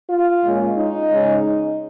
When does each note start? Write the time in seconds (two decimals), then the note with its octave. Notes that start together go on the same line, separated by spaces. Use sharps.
0.09 F4
0.43 A#2 G#3 C#4
0.77 D#4
1.10 C#3 G#3 C#4